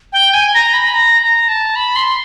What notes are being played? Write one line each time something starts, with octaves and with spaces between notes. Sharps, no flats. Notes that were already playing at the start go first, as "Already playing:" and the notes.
G5
G#5
A#5
B5
A#5
A#5
A5
B5
C6